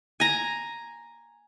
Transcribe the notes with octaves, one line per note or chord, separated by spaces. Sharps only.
G#5 A#5